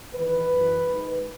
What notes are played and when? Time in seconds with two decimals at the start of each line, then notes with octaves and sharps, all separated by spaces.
0.14 E2 D#3 B4
0.50 F#2 E3
0.86 G#2 D#3